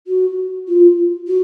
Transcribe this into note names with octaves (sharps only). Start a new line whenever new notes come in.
F#4
F4
F#4